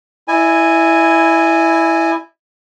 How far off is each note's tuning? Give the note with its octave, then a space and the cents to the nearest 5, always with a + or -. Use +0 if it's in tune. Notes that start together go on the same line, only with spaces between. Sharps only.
E4 +0 D#5 -45 G#5 +0